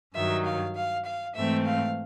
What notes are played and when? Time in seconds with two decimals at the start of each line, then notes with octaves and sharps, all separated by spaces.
0.14 G2 D#3 F#3 E5
0.45 F5
0.75 F5
1.05 F5
1.35 G#2 E3 A3 C4 E5
1.65 F5